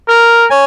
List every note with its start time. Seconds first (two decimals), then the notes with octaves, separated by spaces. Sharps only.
0.08 A#4
0.50 C#5 G#5